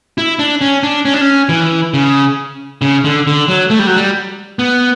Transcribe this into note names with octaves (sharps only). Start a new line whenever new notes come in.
E4
D4
C#4
D4
C#4
D4
C#4
E3
C#3
C#3
D3
D3
F#3
A3
G3
F#3
G3
B3